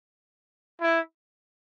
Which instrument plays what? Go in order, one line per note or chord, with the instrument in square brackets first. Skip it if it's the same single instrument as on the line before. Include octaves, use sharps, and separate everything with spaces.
[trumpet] E4